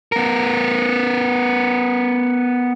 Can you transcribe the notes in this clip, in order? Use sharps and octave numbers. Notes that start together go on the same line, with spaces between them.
B3 A#4